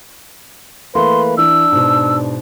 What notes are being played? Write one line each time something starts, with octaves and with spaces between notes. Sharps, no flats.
E3 A3 A#3 B4 C6
E3 D4 E6
G#2 B2